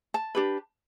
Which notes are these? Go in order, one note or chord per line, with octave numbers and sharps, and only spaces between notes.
A5
D4 G4 B4